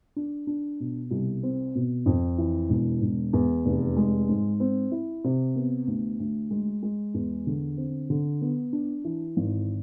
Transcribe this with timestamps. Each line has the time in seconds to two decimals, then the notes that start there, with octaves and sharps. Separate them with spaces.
0.16 D4
0.47 D4
0.80 B2
1.11 C2
1.43 C4
1.75 B2
2.06 F2
2.38 E3
2.70 E1
3.02 E1
3.33 E2
3.66 F1
3.97 G#3
4.29 G#2
4.60 C4
4.92 E4
5.24 C3
5.56 B3
5.87 D2
6.20 D2
6.51 G#3
6.83 G#3
7.14 E2
7.47 D3
7.77 C4
8.10 D3
8.41 B3
8.73 D4
9.04 E3
9.37 G#1